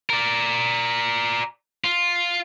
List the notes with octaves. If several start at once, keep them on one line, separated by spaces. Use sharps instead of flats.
A#4 D5
F4